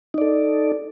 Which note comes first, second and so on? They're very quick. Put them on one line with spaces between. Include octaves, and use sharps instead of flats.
D#4 D5 A4